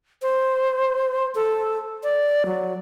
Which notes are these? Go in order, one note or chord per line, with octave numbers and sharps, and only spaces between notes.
C5
A4
D5
F#3